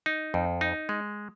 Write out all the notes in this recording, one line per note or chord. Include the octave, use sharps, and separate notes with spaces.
D#4
F2
D#4
G#3